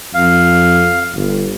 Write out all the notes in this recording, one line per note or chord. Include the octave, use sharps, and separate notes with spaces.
F2 F5
G1